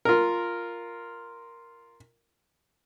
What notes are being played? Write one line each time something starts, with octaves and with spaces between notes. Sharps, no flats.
F4 A#4